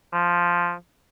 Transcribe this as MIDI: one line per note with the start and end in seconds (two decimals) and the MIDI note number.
0.13 0.73 53